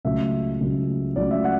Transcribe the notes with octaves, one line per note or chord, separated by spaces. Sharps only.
C#2 C#3 F#3 A3 E5
C#2 C#3 F#3 A3
C#2 C#3 F#3 A3 D5
E5
F#5